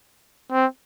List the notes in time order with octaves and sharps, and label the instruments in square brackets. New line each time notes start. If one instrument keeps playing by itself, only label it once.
[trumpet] C4